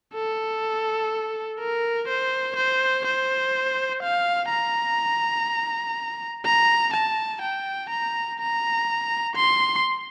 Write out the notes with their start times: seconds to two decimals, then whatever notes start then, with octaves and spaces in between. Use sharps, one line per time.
0.15 A4
1.59 A#4
2.08 C5
2.56 C5
3.05 C5
4.03 F5
4.50 A#5
6.45 A#5
6.94 A5
7.42 G5
7.90 A#5
8.39 A#5
9.36 C6